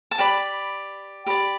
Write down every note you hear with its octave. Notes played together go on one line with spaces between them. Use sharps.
A5
G4 B4 D5 B5
G4 D5 B5